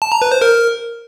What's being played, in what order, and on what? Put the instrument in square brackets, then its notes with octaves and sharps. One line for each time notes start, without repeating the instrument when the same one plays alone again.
[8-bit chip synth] A5
A#5
B4
C5
A#4